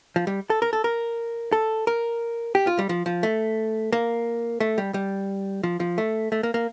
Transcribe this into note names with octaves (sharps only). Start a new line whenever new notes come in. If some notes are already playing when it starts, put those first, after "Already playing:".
F3
G3
A4
A#4
A4
A#4
A4
A#4
G4
F4
G3
F3
F3
A3
A#3
A3
G3
G3
F3
F3
A3
A3
A#3
A#3